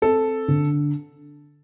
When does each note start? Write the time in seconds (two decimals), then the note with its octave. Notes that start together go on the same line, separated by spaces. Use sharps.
0.02 C4 A4
0.48 D3